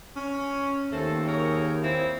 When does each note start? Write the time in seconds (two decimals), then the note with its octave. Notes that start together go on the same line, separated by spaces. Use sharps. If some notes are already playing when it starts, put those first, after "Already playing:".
0.16 C#4
0.91 D#2 A3 C4 A4
1.27 G#4 A#4 C#5
1.82 A#3 C4 E4